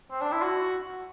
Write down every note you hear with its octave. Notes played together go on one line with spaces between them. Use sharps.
C4
D4
E4
F#4